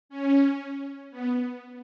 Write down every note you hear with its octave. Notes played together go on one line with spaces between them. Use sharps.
C#4
B3